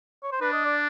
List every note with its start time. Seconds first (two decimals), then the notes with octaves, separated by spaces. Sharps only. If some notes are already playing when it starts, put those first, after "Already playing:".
0.23 C#5
0.32 C5
0.41 D4 B4
0.53 D#5
0.65 D5